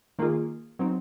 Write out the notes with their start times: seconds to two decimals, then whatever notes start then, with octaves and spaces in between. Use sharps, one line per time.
0.19 D#3 A#3 F4 G#4
0.79 F#3 C4 D#4